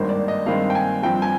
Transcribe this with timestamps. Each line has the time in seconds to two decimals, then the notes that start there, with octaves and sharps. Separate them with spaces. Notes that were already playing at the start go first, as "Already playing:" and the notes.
Already playing: G#1 G2 D#3 A#3 C5
0.09 D5
0.28 D#5
0.46 G2 D#3 G#3 C4 F5
0.70 G5
0.75 G#5
1.03 G2 F3 C4 G5
1.22 G#5